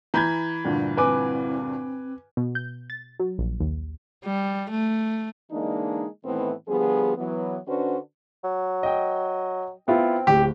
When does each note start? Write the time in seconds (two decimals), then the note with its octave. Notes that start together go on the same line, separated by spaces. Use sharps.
0.14 E3 A#5 B5 G6 G#6
0.64 D2 G2 A#2
0.97 C4 B4 G#5 D6
2.37 B2
2.55 G6
2.90 A6
3.20 F#3
3.39 A#1
3.60 D#2
4.25 G3
4.70 A3
5.51 D3 E3 G#3 A#3 D4 D#4
6.24 A2 D#3 E3 A3 B3 C4
6.68 D3 F3 G3 B3 G#4
7.17 E3 F#3 B3
7.67 D3 C#4 D4 F#4 B4 C5
8.44 F#3
8.83 D#5 G5
9.88 B3 C4 E4 F4
10.27 D1 G4